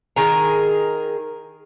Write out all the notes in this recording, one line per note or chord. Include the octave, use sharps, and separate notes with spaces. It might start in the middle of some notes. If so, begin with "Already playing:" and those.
D#3 G#4 A#4